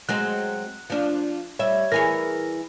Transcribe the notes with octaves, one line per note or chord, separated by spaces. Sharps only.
F#3 G#3 C4 F#6
F3 D4
G3 C#5 E5
E3 G#4 A#4 C#5 A#6